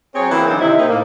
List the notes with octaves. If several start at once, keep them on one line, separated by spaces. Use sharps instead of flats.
F#3 C4 G#4 C#5
C#3 E3 A#3 C4
D3 E3 F#3 C4 D4 D#4
C3 D#3 E4
C3 A#3 C4 D#4
A2 A#3